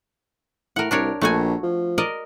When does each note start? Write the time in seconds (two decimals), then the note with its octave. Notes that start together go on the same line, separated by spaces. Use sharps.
0.76 A2 A#4 F#5
0.91 C2 D4 A#4 C#5
1.21 A#1 A3 F#4 G#5
1.63 F3
1.98 A#4 D5 D#5